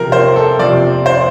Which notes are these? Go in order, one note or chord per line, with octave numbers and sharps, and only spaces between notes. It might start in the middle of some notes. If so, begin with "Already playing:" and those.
Already playing: C3 F3 A#4
C5
A4
C3 F3 D5
C5